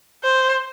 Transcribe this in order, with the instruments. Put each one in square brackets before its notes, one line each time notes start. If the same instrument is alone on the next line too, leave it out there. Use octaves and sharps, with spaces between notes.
[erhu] C5